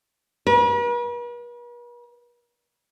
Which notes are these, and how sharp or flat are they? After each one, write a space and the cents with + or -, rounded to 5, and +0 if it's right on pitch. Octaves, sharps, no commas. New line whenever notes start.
B4 -45